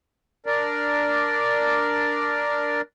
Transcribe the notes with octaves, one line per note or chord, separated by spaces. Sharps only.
D4 A#4 D5